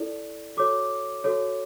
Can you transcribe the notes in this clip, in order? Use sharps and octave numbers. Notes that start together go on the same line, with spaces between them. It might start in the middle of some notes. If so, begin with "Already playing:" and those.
Already playing: E4 A4 D5
F#4 A4 C#5 D6
F#4 A4 C#5